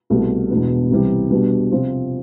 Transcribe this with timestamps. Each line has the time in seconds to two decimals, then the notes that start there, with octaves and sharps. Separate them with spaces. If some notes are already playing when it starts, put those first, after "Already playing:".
0.10 C2 B2 A3
0.50 E1 E2 B2 B3 D4
0.90 C2 C3 E3 G3
1.31 B2 G3 B3 D4
1.71 C3 F3 C4 F4